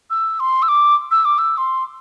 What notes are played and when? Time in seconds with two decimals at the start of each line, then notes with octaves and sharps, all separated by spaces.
0.10 E6
0.40 C6
0.63 E6
0.68 D6
1.11 E6
1.25 D6
1.38 E6
1.58 C6